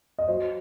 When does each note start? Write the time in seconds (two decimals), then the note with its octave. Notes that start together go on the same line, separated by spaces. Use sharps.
0.18 D#5
0.28 F#3 C5